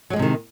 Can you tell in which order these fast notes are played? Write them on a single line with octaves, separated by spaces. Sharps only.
F#3 G#3 F3 C3 D#3